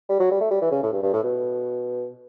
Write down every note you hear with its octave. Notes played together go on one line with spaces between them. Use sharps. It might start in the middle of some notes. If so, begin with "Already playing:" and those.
G3
F#3
G3
A3
G3
E3
C#3
A2
G2
G2
A2
B2